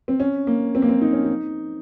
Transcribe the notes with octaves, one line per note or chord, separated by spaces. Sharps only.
C4
C#4
A#3
C4
A#3
C4
D#4
C#4
D#4